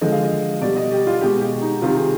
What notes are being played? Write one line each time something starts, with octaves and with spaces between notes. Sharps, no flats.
D3 F3 G#3 D#5
F5
D#5
B2 G3 D5
D#5
G4
F4
B2 G#3 G4
G4
D#4
C3 D#3 G3 F4
G#4